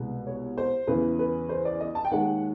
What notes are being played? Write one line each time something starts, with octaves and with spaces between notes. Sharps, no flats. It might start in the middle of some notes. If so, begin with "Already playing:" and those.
Already playing: C2 B2 G#3
C#5
C5
E2 C#3 E3 B4
B4
C5
D5
D#5
A5
G5
D#2 D#3 G#3 F#5